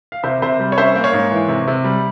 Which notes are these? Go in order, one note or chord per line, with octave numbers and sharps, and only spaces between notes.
F5
C3 C5 E5
C3 C5 E5
G3
C#5
C#4 C5 E5
A#3
C#5 F5
G#2
E3
C3
C3
G3